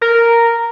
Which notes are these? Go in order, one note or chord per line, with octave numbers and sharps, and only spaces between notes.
A#4